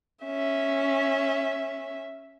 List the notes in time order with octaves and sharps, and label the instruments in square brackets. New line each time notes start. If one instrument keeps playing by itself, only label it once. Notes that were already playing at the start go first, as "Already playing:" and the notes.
[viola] C#4 E5